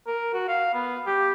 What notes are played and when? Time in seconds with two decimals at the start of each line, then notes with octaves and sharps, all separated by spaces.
0.07 A#4
0.33 F#4
0.48 F5
0.74 B3
1.07 G4